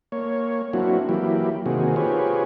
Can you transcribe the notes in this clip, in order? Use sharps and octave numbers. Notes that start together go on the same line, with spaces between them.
A#3 C#5
F#3 A#3 C4 D4 E4 F#4
E3 F#3 A#3 E4 G4
C3 D#3 A#3 C4 F#4 G#4
C4 F4 G4 G#4 B4 C#5